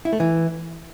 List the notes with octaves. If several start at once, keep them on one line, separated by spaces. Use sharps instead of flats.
E4
A3
E3